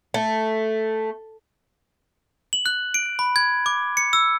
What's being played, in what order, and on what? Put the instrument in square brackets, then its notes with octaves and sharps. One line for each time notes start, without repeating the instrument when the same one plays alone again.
[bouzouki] A3
[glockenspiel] F#7
F#6
D7
B5
G#6
D6
C#7
E6